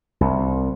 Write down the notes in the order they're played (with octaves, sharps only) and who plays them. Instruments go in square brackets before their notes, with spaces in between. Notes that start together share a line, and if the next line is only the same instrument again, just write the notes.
[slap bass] C2